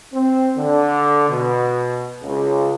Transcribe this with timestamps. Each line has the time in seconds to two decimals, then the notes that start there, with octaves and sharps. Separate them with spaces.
0.13 C4
0.57 D3
1.29 B2
2.23 C#2